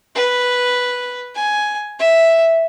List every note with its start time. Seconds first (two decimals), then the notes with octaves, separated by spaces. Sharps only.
0.15 B4
1.35 G#5
1.99 E5